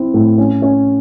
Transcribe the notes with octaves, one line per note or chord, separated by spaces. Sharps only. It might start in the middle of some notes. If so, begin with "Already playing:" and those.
Already playing: C4 E4
A2
C#4
C#4